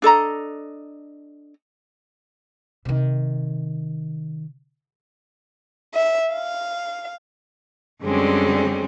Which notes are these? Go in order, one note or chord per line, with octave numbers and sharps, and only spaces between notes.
D4 A4 D#5 A#5
C3 D#3
E5
F5
F#2 D3 G3 G#3 C4 C#4